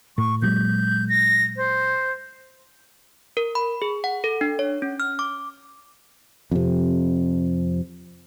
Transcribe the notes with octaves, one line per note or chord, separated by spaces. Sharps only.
A2 C#6
A#2 F#3 G#3 G6
A#6
C5
A#4
B5
G#4
F#5
A4
D4
C#5
C#4
F6
D6
F2 C3